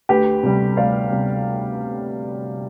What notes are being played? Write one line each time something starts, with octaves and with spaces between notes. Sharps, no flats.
D2 G4 B4
C3 G3
D2 D5 F5
C3 G3